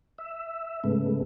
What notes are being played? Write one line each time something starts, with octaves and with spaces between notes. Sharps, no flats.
E5
G#2 C#3 G#3 A3 B3